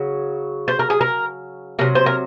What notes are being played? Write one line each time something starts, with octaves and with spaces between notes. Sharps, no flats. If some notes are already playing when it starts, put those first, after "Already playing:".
Already playing: C#3 F#3
C5
A#4
G#4
A#4
C3 F#3 A#4
C5
A#4